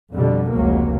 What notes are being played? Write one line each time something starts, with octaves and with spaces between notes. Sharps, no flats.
F2 B2 D3 G3
F1 C#2 F#3 A#3